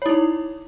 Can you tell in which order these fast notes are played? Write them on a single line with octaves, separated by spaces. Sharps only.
C#5 E4 D#4